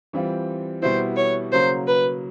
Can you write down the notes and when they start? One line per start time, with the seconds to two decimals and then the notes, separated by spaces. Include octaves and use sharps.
0.13 E3 G3 C4 F4
0.82 B2 G3 B3 E4 C5
1.17 C#5
1.52 C#3 F#3 A#3 C5
1.87 B4